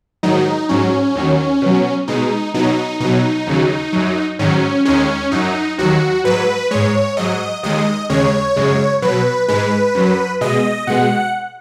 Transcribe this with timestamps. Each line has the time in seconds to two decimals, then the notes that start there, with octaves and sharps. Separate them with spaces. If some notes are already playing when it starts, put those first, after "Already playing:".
0.23 G#2 D#3 F#3 D#4
0.69 G#2 F#3 C#4
1.15 D#2 D#3 F#3
1.62 B2 F#3
2.08 B2 G#3 D#4
2.54 B2 F#3 D#4
3.00 B2 F#3 D#4
3.47 D#2 C#3 F#3
3.93 F#2 F#3
4.39 G#2 D#3 F#3 C#4
4.85 D#2 D#3 G#3 C#4
5.31 F#2 F#3 D#4
5.78 D#2 D#3 F#3 F#4
6.24 G#2 F#3 B4
6.71 G#2 G#3 C#5
7.17 G#2 F#3 D#5
7.63 D#2 D#3 G#3 D#5
8.09 D#2 C#3 G#3 C#5
8.56 F#2 C#3 G#3
9.02 B2 F#3 B4
9.48 G#2 G#3 B4
9.95 F#2 F#3
10.41 B2 G#3 D#5
10.87 B2 G#3 F#5